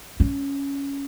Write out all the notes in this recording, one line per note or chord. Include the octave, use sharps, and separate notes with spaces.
C#4